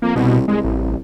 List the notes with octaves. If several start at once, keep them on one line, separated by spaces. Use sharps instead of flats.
F2 A#3
C2 B2
C2 G#3
A1